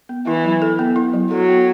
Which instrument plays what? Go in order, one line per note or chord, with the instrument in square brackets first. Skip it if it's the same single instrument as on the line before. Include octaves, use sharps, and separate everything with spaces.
[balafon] B3
[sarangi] E3 [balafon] E4
[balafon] F#3
A4
B3
E4
F#3
[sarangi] F#3 [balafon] A4
[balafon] B3